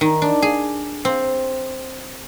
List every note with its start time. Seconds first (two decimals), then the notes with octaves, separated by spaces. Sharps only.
0.01 D#3
0.22 D4
0.42 G#4
1.05 C4